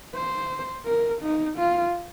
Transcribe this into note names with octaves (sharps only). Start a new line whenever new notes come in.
C5
A#4
D#4
F4